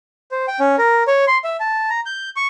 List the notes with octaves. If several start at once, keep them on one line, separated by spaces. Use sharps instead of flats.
C5
G5
C#4
A#4
C#5
C6
E5
A5
A#5
G6
C#6